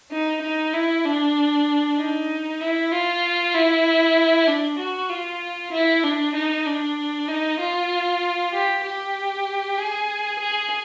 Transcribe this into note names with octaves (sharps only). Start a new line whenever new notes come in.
D#4
D#4
E4
D4
D#4
E4
F4
E4
D4
F#4
F4
E4
D4
D#4
D4
D#4
F4
G4
G4
G#4
G#4